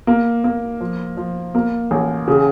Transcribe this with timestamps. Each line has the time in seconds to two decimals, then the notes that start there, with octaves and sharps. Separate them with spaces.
0.07 A#3
0.44 A#3
0.80 F3
1.17 F3
1.55 A#3
1.91 A1
2.28 C#3